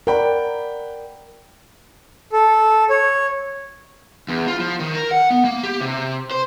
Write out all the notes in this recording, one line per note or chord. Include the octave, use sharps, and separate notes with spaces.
A#4 D5 F#5 G5 B5
A4
C#5
E2
F4
F3
D#3
A#4
F#5
B3
A#3
G4
C3
C5